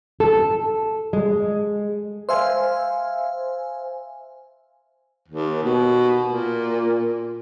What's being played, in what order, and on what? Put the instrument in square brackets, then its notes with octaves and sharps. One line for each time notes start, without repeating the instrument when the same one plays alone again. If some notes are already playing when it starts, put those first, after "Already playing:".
[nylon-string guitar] A4
G#3
[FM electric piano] C5 E5 F5 G#5
[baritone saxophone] D#2
B2
A#2